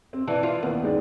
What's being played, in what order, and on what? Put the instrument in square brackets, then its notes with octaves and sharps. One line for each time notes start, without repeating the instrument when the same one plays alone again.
[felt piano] C4
[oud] E3 [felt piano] D5 A5
[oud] F4
[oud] D#2 [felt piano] B3
[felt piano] G#3 D#4 D5